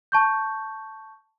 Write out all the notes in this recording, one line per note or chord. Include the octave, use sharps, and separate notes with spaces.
A5 C#6 G6